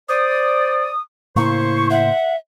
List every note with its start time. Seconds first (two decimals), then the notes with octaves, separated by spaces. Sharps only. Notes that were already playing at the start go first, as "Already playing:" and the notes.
0.08 C5 D5 D#6
1.36 A2 C#3 A#3 E4 C5 C#6
1.90 E5 F#5